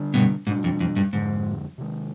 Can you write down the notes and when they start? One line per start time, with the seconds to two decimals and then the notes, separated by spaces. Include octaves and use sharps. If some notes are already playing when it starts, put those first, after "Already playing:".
Already playing: D3 G3 D4
0.14 G2 B2
0.47 G#2 B2 G3 B3 D4
0.64 F2
0.80 F2
0.96 G2
1.13 F2 G#2 D3 F3 G#3
1.78 C3 D#3 G#3